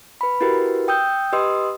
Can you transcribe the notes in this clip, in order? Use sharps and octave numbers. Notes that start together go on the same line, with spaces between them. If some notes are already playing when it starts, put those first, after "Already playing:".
B4 B5
E4 F#4 G4 A#4 B4
G5 D#6 E6 G6
G4 B4 D#5 C6 D#6 E6